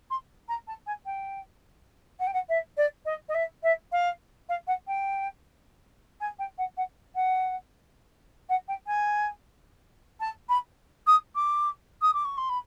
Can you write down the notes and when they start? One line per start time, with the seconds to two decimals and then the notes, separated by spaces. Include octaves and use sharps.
0.10 C6
0.48 A#5
0.67 A5
0.86 G#5
1.06 G5
2.19 F#5
2.27 G5
2.33 F#5
2.49 E5
2.77 D5
3.05 D#5
3.29 D#5
3.34 E5
3.63 E5
3.92 F5
4.49 F5
4.67 F#5
4.87 G5
6.20 G#5
6.39 G5
6.58 F#5
6.77 F#5
7.15 F#5
8.49 F#5
8.68 G5
8.87 G#5
10.20 A5
10.49 B5
11.07 D#6
11.35 D6
12.02 D#6
12.14 D6
12.25 C#6
12.37 C6
12.49 B5